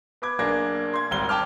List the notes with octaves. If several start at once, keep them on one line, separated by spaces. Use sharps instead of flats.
B3 B5 D6 G#6
B1 A#3 D4 G#4 G#6 A#6
C6 G#6
D#1 G#1 C4 G7
G5 A5 D6 F6